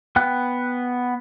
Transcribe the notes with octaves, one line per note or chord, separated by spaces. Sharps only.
B3 G5 F#6